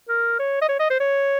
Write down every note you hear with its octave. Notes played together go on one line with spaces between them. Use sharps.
A#4
C#5
D#5
C#5
D#5
C5
C#5